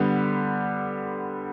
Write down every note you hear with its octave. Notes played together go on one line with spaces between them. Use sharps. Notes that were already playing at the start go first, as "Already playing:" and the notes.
Already playing: D3 G3 B3